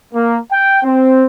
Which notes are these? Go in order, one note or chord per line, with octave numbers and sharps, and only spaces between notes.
A#3
G5
C4